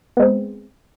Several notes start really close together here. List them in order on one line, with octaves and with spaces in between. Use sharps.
B3 G#3 C4